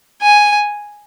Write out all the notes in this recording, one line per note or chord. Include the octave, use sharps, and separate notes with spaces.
G#5